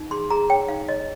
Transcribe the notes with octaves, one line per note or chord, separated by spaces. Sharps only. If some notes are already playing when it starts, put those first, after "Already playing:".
Already playing: D#4
G#4 C6
G#4 A#5
C#5 G5
D#4 F5
C#5 D#5